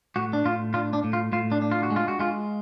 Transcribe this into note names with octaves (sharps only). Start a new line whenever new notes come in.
A2 F#4
D4
A2 F4
D4 F4
D4
A2
F4
A2 F4
D4
D4
F4
F#4
G#3
F4
F#4
G#3 F4